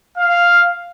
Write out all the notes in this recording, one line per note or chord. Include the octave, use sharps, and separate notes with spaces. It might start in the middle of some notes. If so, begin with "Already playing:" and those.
F5